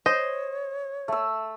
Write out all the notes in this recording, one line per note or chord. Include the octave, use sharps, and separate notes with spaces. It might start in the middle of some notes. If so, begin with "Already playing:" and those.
C5 C#5 D#5
A3 E6